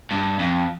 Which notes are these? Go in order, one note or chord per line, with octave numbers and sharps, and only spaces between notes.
G2
F2